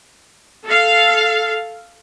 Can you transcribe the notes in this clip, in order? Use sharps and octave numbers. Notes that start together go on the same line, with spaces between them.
A4 F5